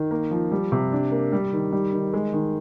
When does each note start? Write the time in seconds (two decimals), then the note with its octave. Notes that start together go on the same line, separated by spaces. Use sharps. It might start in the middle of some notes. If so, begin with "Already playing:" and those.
Already playing: D#3
0.11 A#3
0.31 F3
0.51 G3
0.72 C3
0.92 D4
1.11 A#3
1.32 G3
1.53 D#3
1.72 G3
1.92 D#3
2.13 G#3
2.33 D#3